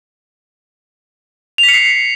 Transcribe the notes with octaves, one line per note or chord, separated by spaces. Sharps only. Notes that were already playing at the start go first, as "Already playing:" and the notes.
F7
B6
C#7
C7